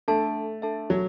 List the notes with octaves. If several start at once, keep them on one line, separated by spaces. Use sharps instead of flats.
A3 D4 A4 E5 A5
D4 A4 E5 A5
F#3